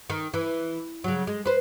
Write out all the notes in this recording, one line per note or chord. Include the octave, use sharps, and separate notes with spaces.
D#3
E3
C#3 F#3
G#3
B4 C5